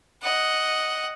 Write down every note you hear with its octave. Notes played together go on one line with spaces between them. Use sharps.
D#5 F#5